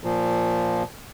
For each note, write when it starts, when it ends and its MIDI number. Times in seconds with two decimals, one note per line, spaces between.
0.04 0.83 46
0.04 0.83 53